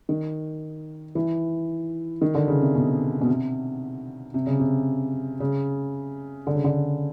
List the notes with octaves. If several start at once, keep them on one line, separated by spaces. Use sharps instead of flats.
D#3
E3
D#3
D3
C#3
C3
B2
B2
C3
C3
C#3
C3
C#3
D3
C#3
D3